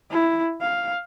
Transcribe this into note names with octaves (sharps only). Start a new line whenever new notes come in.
E4
F5